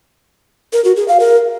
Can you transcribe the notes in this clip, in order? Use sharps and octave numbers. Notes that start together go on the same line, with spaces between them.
A#4
F#4
G#4
F5
A#4